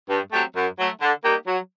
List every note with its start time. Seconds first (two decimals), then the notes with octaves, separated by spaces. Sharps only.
0.10 G2
0.33 F#3 A3 C4 G4
0.56 F#2
0.79 F#3 A3
1.01 D3
1.25 G3 A#3 D#4 G4
1.47 F#3